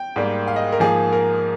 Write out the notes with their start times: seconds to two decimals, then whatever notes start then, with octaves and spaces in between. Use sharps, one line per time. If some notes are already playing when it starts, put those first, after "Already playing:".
Already playing: G5
0.16 G#2 G3 A#3
0.47 F5
0.56 D#5
0.72 A#4
0.80 G#2 F3 A#3 G#4
1.13 A#4